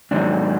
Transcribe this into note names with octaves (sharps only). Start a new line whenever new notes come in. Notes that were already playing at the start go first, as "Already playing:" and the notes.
G#2 D#3 F#3 D4